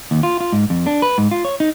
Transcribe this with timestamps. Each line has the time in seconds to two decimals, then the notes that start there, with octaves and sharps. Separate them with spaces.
0.11 D#2
0.23 F4
0.40 F4
0.52 G#2
0.70 F2
0.87 D4
1.02 B4
1.18 G#2
1.31 F4
1.45 C#5
1.60 D#4